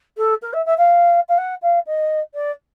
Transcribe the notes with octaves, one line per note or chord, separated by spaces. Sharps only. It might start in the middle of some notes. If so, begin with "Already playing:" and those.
A4
A#4
E5
E5
F5
F5
F#5
F5
D#5
D5